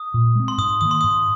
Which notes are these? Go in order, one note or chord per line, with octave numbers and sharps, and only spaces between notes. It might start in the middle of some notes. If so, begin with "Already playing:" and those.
Already playing: D#6
A#2
G#3 C4
C6
G#2 D#6
D#3 A#3 D#6
C6
G#2 D#6